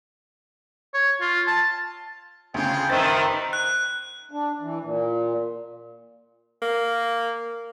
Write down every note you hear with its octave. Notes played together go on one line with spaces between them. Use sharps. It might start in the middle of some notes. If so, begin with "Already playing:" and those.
C#5
F4
A5
D2 C#3 F4 G#4 G5
F#1 D#3 G4 B4 C5 E5 A6
F#6
D4
E3
A#2
A#3